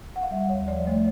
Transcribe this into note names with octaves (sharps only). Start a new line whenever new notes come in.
F#5
F5
G3 E5
D#2 C#5
F3 D5
A3 C#5